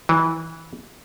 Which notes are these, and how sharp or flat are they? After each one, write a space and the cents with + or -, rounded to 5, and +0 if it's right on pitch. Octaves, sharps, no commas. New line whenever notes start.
E3 -20